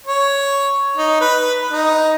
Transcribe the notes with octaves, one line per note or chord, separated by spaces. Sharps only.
C#5
D#4
B4
D#4